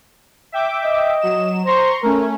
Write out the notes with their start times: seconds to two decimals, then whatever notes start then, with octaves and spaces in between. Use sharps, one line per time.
0.52 E5 G5 D6
0.85 D#5
1.21 F#3 E7
1.66 C5 A#5 C6 C#6
2.03 A3 C#4 A#4